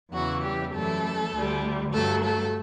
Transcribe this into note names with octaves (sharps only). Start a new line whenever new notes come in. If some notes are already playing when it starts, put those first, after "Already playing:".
E2 C#3 E3 F#3 F#4
G3 G4
F#2 E3 G3 A3 A4
D2 D3 G3
G2 F#3 A3 A4
A3 A4